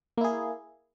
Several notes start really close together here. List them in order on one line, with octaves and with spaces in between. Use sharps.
A#3 E4 G#4